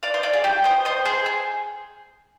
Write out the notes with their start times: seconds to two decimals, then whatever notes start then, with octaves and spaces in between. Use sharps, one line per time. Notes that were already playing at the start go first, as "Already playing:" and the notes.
0.03 D5 F5
0.14 C5 D#5
0.23 D5 F5
0.33 G#4
0.44 G4
0.64 C5 D#5
0.85 C5 D#5
1.05 G#4 C5
1.26 G#4